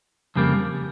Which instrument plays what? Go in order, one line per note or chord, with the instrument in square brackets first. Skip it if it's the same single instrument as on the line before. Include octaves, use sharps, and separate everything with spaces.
[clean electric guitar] F2 C#3 G3 A#3